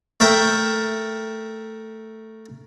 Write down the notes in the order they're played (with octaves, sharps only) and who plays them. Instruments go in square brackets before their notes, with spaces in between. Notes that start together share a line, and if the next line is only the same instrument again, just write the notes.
[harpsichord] A3 A#4 E5 G5